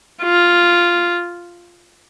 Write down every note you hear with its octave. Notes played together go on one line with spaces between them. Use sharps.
F4